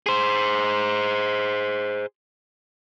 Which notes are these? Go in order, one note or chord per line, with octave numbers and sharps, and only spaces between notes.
G#4 C5